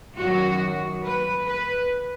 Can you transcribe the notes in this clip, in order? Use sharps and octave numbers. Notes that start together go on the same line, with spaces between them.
F#2 D#3 F#3 F#4
B4
B4